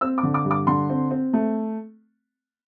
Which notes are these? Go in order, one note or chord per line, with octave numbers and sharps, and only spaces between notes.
C4 E6
D6
D3
D6
G2
D6
D3 C6
C4
C4
A3